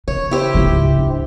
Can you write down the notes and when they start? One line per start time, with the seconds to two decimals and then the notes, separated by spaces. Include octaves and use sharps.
0.08 C#3 C#5
0.31 E4 G4 C5
0.54 C#2 G#2
0.99 D4